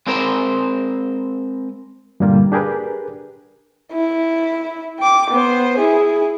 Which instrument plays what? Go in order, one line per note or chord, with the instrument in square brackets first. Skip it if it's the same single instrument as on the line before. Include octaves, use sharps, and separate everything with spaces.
[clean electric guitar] G#3 C4 A#4 C5
[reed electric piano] G2 A#2 D3 G3 A#3 F4
D4 G4 G#4 A#4 B4
[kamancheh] E4
G5 D6
B3 C5
E4 G#4